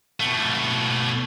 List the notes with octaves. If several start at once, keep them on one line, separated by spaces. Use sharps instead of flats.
B2 A3